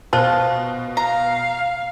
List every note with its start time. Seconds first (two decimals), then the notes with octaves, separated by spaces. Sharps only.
0.13 B2 F4 C5 A5
0.97 F5 A#5